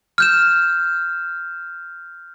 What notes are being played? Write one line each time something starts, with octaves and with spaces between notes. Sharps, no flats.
F6 G6 E7